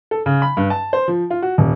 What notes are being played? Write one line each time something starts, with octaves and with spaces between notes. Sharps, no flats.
A4
C#3
B5
G2
A5
C5
F3
F4
F#4
D#1